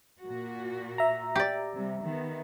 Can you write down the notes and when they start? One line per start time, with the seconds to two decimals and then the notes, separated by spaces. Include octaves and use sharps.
0.20 A#2 F#4
0.98 E5 A#5
1.36 G4 D5
1.73 C3 G3
2.03 D#3 B3